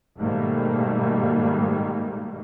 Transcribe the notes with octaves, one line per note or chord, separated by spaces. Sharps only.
G#2 B2 D#3 G3 A3 A#3